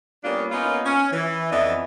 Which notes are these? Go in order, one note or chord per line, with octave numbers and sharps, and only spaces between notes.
G3 A#3 B3 C#4 D4 F4
A#3 B3 C#4 D#4 F4
C#4
E3
F2 E3 B3 D4 D#5 E5